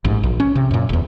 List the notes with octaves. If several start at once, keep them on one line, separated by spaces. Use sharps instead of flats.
A1 G#2
A#1
C#4
C3
F#2 A#2
D#1 E2